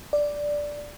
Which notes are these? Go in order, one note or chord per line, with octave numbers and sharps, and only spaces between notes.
D5